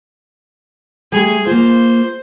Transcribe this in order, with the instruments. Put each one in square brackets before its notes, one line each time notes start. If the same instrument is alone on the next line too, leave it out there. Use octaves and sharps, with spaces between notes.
[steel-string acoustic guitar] G3 A3 [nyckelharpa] G#4
[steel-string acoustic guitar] A#3 F4 [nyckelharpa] C5